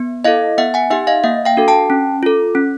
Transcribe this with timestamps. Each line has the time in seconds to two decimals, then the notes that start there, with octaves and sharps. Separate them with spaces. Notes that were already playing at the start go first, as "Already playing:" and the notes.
Already playing: B3
0.24 E4 A4 D#5 F5
0.58 B3 E5 F#5
0.74 F#5 G#5
0.90 D#4 G4 E5 F#5
1.07 D#5 F5
1.24 A#3 E5 F#5
1.45 F5 G5
1.57 D4 F#4 A4
1.68 G5 A5
1.90 C#4
2.23 F4 A4
2.55 C#4